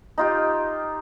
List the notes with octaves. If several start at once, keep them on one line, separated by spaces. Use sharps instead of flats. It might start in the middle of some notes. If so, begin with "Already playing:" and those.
D#4 F4 G4